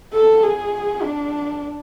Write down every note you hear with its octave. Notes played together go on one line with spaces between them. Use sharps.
A4
G#4
D4